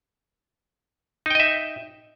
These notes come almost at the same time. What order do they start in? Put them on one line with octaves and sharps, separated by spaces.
D#4 G5 D#5 E5